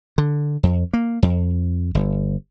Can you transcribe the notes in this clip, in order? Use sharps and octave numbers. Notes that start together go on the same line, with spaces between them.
D3
F2
A#3
F2
G1